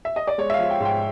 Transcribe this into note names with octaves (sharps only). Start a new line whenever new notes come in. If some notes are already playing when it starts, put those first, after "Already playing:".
E5
D#5
D5
G#3 C#5
E5
F3 F5
G5
G#2 G5